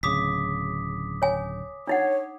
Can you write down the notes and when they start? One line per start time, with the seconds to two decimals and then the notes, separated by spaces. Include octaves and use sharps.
0.03 D1 C#3 D6 D#6 B6
1.22 C#5 G#5
1.87 D4 D#4 C#5 F#5